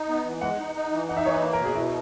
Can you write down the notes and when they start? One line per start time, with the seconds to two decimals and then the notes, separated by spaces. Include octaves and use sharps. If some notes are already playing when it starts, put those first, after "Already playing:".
Already playing: D#4
0.08 B3
0.25 E3
0.41 G#3 F#5
0.59 D#4
0.75 D#4
0.92 E3
1.09 D#4 F#5
1.17 E5
1.25 E3 C#5
1.34 B4
1.42 A#3
1.53 A#4
1.60 B2
1.65 G#4
1.75 B2 E4